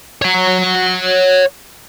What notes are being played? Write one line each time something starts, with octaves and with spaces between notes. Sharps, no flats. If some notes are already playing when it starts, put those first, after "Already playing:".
C#5 F#5